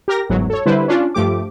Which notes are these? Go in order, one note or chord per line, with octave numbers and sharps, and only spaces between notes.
G4 A#4 A#6
G1 E2 G#2 F#3
A4 C#5
D3 G3 E4 B4 C5
C#4 D4 F4
G2 F3 A3 G4 D6